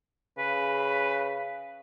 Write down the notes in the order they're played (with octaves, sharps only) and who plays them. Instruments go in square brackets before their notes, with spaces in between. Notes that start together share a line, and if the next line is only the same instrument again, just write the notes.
[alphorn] C#3 [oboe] B4